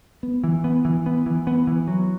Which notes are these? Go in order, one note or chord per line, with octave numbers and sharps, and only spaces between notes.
B3
E3
B3
E3
B3
E3
B3
E3
F#3